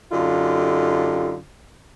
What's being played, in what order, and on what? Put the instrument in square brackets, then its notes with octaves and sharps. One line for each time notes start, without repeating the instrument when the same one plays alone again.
[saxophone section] F#2 D3 D#4 [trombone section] F4 G4 A4